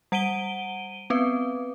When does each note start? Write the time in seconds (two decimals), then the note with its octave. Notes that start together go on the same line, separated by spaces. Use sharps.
0.12 G3 F#5 D7 D#7 G7
1.10 B3 C4 B4